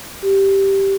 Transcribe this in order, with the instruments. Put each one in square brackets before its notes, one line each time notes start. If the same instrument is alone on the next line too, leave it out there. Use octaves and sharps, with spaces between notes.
[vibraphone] G4